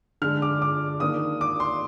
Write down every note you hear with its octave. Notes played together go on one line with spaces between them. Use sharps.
D3 G#3 D4 F6
D6
D6
D#3 A#3 D4 D#6
D6
C6